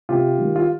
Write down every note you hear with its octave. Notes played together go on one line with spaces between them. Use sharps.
C3 F4 G4
D#3 G3
F4